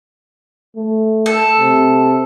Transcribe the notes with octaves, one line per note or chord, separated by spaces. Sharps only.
A3
A4
C3